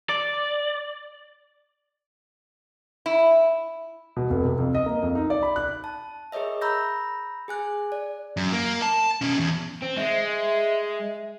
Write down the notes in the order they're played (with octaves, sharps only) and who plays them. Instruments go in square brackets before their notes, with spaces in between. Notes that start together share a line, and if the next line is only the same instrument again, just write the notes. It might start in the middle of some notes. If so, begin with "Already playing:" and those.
[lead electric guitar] D5
[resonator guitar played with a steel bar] E4
[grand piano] B2
F1
C3
F2
D#5
A#3
F2
D#4
D5
B5
F#6
[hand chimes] A5
G#4 A#4 C#5 D#5 E5
A#5 B5 E6 G6 A#6
G#4 G#5 F#6
D5
[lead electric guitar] F#2
A#3
A5
B2 C#4
E2
[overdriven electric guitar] C4
[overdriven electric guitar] G#3 [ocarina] E5